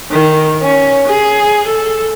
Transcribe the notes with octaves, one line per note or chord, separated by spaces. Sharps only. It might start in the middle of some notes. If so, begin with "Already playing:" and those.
D#3
C#4
G#4
A4